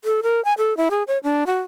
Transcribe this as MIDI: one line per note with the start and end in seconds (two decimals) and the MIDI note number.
0.05 0.21 69
0.23 0.43 70
0.45 0.53 80
0.58 0.77 69
0.77 0.88 64
0.91 1.03 68
1.08 1.18 73
1.23 1.44 62
1.47 1.59 66